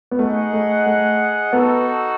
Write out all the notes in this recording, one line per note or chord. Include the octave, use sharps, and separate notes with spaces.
B3
A3 D#4 G#4 D#5 F#5
A3
A3
B3 D#4 F#4 A4